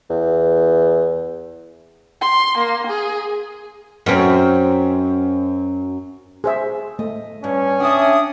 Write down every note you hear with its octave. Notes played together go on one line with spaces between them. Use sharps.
E2
C6
A#3
G#4
F#2 C4
G#4 C5 E5
A3 D#5
G2 C#4
D4 E5 F#5 G5 D#6